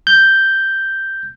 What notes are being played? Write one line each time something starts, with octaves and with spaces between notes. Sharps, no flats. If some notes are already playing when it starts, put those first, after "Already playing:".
G6